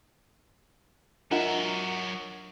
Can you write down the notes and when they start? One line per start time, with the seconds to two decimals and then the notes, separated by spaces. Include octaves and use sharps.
1.31 F#3 D4 F4 A#4 D#5 E5 F#5